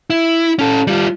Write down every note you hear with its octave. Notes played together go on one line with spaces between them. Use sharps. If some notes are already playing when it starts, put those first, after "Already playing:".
E4
C#4 A4
G3 F4